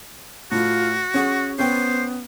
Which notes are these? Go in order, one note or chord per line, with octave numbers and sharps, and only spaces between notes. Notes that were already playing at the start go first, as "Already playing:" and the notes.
A2 F4 F#4
C#4 G#4 F#5
B3 C#4 C5 G5